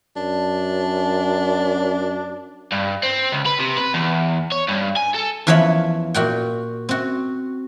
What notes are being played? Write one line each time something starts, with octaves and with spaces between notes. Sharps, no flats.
F#2 D4
G2
C4
C#2
B4
C3
B4
E2
C#5
G2
G#5
A4
E2 E3 F3 C#5 E5 B5
A#2 F#4 G5
C4 F#4